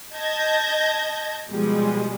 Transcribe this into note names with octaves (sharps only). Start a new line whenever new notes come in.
D#5 A5 G6 G#6 A#6
B2 F3 G3 G#3